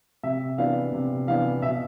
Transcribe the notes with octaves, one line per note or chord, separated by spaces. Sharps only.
C3 E5
E3 B3 D4 F5
C3
E3 B3 D4 F5
B2 E5